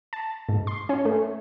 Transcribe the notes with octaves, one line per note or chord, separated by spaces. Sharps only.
A5
G#2
C6
C#4
A3